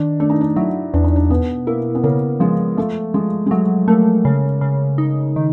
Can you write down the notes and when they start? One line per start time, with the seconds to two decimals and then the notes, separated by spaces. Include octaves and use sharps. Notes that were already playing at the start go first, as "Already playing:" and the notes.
Already playing: D#3 D4
0.20 A3 D4
0.30 D#4
0.41 D4
0.56 F#3 E4
0.94 E2 D4
1.04 D#4
1.16 D4
1.30 B2 B3
1.67 A#3 E4
1.95 B3
2.04 C#3 A#3
2.40 F3 G#3
2.77 F3 A3
3.14 F3 G#3
3.46 G#3
3.51 F#3 A3
3.88 A3 A#3
4.25 C#3
4.61 C#3
4.98 D#4
5.36 D#3